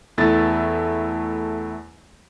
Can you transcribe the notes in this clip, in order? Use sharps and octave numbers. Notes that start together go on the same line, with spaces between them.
E2 A3 E4 A6